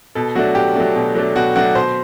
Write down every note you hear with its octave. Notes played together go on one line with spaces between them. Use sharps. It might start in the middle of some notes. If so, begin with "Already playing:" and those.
B2 A4
F#3 A3 D4 F#4
B2 G4
F#3 A3 D4
B2
F#3 A3 D4
B2 F#4
F#3 A3 D4 F#4
B2 C5